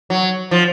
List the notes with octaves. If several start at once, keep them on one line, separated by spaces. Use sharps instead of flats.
F#3
F3